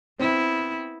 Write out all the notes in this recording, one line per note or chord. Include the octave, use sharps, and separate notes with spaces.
B3 C4 E4